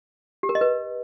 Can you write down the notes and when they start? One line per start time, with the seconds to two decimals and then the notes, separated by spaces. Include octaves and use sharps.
0.43 G4
0.49 A#4
0.55 D#5
0.61 B4